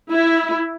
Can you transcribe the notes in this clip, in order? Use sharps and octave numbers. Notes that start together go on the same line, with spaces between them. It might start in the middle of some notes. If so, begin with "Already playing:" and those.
E4